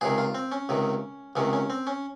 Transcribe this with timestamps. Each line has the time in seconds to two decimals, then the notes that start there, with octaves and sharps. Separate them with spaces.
0.01 C#2 C3 D#3 G#4
0.18 F4
0.35 C4
0.52 C#4
0.69 C#2 C3 D#3
1.36 C#2 C3 D#3 C#4
1.53 C#4
1.70 C4
1.87 C#4